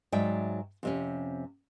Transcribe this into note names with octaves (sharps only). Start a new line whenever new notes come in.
G#2 F#3 D5 E5 G5
F2 C3 C#4